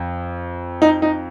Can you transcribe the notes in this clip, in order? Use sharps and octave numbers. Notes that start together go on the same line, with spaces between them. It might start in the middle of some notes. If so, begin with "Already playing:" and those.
Already playing: F2
D#4
D#4